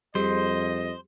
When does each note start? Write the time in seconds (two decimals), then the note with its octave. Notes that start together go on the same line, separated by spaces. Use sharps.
0.15 F2 G3 G4 G#4 C5 D#5